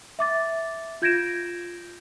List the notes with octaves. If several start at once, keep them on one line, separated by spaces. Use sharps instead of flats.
E5 D6 A6
F4 G6 G#6 A#6 D7 E7